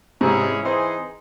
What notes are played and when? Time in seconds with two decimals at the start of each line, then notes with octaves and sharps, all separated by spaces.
0.21 G#2 C3 E3 G#3 C#4 E4 G#4
0.60 E3 C4 D#4 G#4 C5